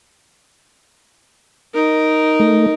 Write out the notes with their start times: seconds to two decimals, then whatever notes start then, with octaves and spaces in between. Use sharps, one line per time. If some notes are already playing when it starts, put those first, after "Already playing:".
1.74 D#4 A#4
2.40 A3